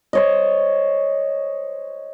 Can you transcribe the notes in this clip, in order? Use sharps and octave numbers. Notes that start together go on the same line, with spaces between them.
C5 C#5 D#5